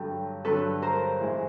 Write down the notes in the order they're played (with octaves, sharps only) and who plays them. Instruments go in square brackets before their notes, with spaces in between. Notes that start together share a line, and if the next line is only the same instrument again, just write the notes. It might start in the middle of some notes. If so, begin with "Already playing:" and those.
Already playing: [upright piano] G2 D3 F#3 [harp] G4 A4
[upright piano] G2 D3 F#3 [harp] A4 B4
[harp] A#4 C5
[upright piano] A2 E3 G#3